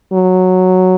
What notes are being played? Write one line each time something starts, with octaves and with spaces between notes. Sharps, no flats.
F#3